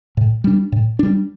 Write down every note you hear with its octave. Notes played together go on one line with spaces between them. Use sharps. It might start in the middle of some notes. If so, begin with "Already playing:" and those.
A2
G3 D4
A2
G3 D4